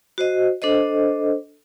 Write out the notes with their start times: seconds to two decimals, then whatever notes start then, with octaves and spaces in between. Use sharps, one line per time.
0.18 F#4 C5 D#5
0.62 D4 A4 C5 D#5